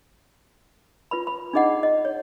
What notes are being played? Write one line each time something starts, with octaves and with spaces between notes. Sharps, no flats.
F4 B4 B5
B5
D4 D#4 G#4 D#5 F#5
D#5
C#5